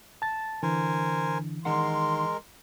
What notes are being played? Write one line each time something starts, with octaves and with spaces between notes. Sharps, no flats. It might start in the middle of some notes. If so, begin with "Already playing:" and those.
A5 A6
D3 E3 A#4 C5 G#5
D#3 G#3 D#4 A#4 F#5 C6